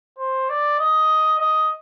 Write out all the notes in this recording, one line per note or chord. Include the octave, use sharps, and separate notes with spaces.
C5
D5
D#5
D#5